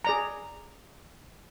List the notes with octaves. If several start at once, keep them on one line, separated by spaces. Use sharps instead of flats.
G#4 D5 A#5